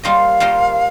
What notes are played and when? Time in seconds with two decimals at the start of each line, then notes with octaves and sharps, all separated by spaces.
0.03 G3 A#3 F4 C5 D#5 F5
0.40 G3 A#3 F4 C5 D#5